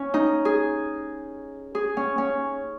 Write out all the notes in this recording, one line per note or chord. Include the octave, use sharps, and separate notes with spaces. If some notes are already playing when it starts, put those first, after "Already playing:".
Already playing: C#4
D#4
G#4
G#4
C#4
C#4